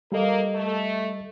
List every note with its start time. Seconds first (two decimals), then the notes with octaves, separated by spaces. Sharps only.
0.12 G3 A#3 A4 D#5
0.54 A3